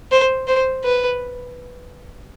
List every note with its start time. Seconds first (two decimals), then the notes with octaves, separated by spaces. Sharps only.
0.11 C5
0.47 C5
0.84 B4